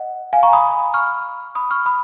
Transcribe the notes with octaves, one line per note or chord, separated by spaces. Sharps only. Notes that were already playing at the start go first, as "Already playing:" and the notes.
Already playing: D#5 F#5
F5 G#5
A#5 C#6
B5 D#6
C#6 F6
B5 D#6
C#6 F6
B5 D#6